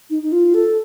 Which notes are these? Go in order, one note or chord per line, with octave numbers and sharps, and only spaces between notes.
D#4
D#4
F4
A4